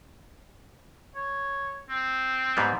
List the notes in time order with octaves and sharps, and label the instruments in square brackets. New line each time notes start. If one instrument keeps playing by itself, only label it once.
[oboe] C#5
C4
[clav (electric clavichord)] G#2 G3 B3